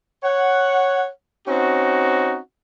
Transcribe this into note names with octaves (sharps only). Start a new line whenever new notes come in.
C#5 F#5
C4 C#4 D#4 F#4